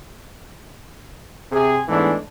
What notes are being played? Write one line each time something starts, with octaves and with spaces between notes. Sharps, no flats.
C3 G#4
E2 G#2 E3 G#3 A3 D4